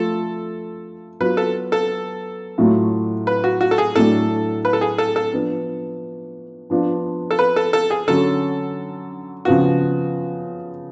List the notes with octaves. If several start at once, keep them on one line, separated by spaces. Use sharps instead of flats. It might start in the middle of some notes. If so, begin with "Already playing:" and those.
Already playing: F3 A3 F4 A4
F#3 B3 F4 B4
A4
A4
A2 F#3 A3 F4
B4
F#4
F#4
A4
G#4
A2 F#3 A3 D4 A4
B4
A4
G#4
A4
A4
F3 B3 D4
F3 B3 D4 F4
A4
B4
A4
A4
G#4
D3 F#3 C#4 A4
C#3 F3 B3 F4 F#4